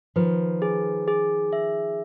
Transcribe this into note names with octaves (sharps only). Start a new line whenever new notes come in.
D#3 F3 B4
G#4
G#4
E5